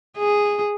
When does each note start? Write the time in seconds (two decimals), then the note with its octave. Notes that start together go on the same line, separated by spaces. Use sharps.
0.17 G#4